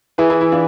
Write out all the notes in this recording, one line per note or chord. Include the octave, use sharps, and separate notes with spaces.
E3 G#4 B4
E4 G#4
E4
D4 F4